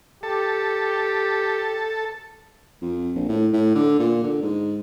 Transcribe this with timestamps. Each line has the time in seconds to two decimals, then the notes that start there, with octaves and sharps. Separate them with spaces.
0.23 G4 A4
2.82 F2
3.15 A#1
3.29 A2
3.53 A2
3.75 D3
3.99 A#2
4.23 D3
4.42 G#2